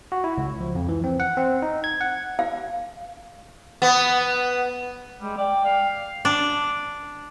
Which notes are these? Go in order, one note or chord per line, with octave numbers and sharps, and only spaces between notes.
F#4
E4
C#2
F3
F2
E3
C4
F#5
C4
D#4
G#6
F#5
F5
B3
G3 G#3
D5 G5
F5
D4